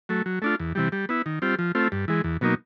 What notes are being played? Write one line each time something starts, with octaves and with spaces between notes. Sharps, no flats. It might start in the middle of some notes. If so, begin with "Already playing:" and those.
F#3 A3
F#3
A3 D4 F4
E2
C3 E3 G3
G3
B3 E4
D#3
G3 C4 F4
F3
A3 C4 F4
G2
E3 G#3
E2
B2 F#3 A#3 D#4